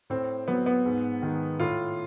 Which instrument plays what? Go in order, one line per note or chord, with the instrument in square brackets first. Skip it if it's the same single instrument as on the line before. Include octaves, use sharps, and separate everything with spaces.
[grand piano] A2 C4
F#3 B3
B3
G#2
D#3 G#3
A2 F4